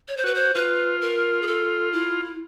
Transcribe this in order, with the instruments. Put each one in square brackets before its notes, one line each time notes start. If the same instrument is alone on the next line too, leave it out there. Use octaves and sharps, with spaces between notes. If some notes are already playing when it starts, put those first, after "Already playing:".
[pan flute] C#5
C5
[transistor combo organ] F#4 [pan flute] B4
[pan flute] C5
[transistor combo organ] F4 [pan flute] B4
[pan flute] A#4
G#4
A4
E4